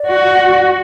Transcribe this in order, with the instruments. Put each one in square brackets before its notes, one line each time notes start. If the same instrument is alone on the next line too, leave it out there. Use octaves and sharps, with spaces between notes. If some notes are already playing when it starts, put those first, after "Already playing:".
Already playing: [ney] D5
[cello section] F#4